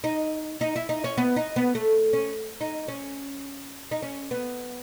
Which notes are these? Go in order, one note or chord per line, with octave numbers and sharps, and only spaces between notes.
D#4
D#4
E4
D#4
C#4
B3
D#4
B3
A3
C#4
D#4
C#4
D#4
C#4
B3